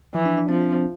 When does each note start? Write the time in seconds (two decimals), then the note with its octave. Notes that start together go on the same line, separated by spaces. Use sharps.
0.14 E3 F3
0.26 D4
0.37 D4
0.49 F3 C4
0.62 D4
0.73 C4